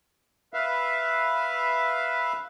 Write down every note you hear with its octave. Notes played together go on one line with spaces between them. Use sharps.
B4 E5 F5